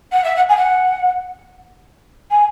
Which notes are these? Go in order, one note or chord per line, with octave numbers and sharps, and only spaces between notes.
F#5
E5
F#5
G#5
F#5
G#5